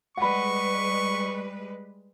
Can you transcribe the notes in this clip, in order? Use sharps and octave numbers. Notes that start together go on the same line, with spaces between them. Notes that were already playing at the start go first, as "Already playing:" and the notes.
G3 G#3 B4 F#5 B5 C#6